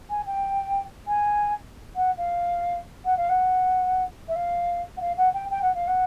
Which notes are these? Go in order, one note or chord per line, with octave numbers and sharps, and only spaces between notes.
G#5
G5
G#5
F#5
F5
F#5
F5
F#5
E5
F5
F#5
F5
F#5
G5
G5
F#5
F5
F#5